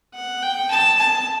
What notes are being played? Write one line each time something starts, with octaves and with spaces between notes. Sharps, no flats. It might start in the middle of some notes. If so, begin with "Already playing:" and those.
F#5
G5
A5
A5